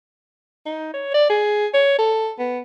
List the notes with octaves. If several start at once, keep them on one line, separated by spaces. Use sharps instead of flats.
D#4
C#5
D5
G#4
C#5
A4
B3